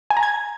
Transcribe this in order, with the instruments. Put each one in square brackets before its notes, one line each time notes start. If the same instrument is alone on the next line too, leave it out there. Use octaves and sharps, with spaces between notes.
[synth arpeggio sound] G#5
A#5
G#6